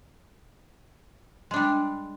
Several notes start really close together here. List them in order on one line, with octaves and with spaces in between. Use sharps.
G#3 D4 G3